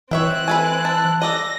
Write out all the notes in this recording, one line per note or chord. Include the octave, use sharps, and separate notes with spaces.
E3 C4 C#5 E5 G5 F#6
A3 A4 B4 G#5
E4 A5
A4 D5 D#5 A#6